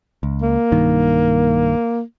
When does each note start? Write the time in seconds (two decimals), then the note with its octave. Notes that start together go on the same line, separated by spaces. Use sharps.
0.23 C#2
0.42 A#3
0.72 B1 G2 D#3